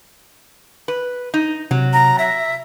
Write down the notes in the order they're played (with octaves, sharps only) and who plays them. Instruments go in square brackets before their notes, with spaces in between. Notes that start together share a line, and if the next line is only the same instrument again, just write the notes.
[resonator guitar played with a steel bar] B4
D#4
[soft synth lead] C3 [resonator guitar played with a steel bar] F#3
[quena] A#5
[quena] E5 [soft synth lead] A#6